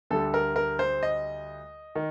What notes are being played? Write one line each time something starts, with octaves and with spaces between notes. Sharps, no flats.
D2 D3 G3 A4
A#4
A#4
C5
D#5
D#3